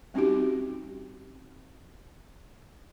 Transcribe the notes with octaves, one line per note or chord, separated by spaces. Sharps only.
G3 C4 C#4 D#4 F#4 G4